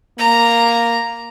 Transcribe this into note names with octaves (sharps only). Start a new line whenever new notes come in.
A#3 A#5